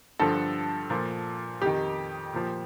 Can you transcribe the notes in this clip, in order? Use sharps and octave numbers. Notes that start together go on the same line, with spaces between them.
G2 D3 F3 A4
A#2 F3
F2 D#3 G4
A#2 F3